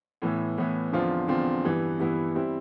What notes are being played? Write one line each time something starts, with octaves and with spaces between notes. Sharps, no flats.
A2 E3 B3
A2 E3 B3
E2 D3 F3 C4 F4
E2 D3 F3 C4 F4
G2 E3 B3 E4
G2 E3 B3 E4
G3 C4 E4